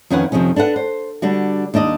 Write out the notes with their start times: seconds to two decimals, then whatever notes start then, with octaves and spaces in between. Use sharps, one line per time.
0.10 F2 D#3 C#4 A#4 B4 F#5
0.32 F2 C3 D#3 F3 C#4
0.56 D4 A4 B4 F#5
0.76 C5
1.22 D3 G3 D4 F#4
1.74 D#2 D4 D5 D#5